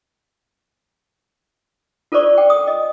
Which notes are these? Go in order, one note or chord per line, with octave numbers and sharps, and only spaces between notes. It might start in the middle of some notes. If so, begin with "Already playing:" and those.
F4 A4 A#4 C5 D5 C#6
G5
D#6
D#5